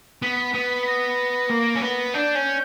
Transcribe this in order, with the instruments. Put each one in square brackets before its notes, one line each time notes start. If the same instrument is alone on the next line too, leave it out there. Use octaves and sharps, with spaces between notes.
[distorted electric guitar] B3 [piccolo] B6
[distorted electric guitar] B3
[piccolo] B6
A#6
[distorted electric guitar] A#3
C#4
B3
[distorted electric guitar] D4 [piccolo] G6
[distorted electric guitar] C#4